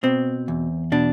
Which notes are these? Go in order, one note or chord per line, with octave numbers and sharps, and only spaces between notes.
B2 C4
E2
B2 D4